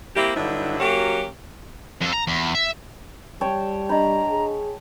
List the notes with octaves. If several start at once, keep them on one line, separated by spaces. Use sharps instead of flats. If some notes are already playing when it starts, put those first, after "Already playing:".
A#3 C4 E4 G4
G2 D3 F#3 D#4 E4
F#3 A#3 C#4 F#4 G4
F2 A4
A#5
E2
E5
G3 C#5 G5 A5
D4 D#5 A#5 B5
G#4